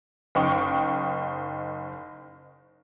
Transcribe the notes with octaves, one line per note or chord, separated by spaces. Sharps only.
F#1 D#4 G5 C#6